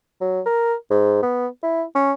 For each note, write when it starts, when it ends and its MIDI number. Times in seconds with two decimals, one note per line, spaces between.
0.21 0.41 54
0.46 0.74 70
0.90 1.21 44
1.22 1.47 59
1.63 1.83 64
1.95 2.12 61